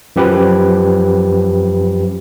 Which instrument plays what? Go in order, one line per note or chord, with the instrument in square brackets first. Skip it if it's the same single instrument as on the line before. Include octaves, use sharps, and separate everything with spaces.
[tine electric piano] F#2 F3 G4 B4